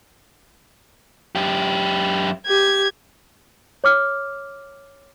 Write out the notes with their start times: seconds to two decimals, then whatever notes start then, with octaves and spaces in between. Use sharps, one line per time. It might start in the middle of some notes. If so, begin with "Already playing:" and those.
1.35 F#2 G4
2.47 G4 G#6
3.84 C#5 D6 F6